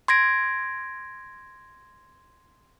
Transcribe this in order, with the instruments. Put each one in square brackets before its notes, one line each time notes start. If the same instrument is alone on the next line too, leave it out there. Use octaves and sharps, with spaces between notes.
[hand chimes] C6 G#6 A#6 D7